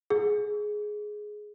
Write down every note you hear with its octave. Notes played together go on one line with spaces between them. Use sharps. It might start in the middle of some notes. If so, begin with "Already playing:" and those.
G#4